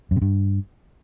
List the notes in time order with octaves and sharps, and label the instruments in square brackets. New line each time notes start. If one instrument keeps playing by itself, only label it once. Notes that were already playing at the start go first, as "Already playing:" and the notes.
[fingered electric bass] F#2
C3
G2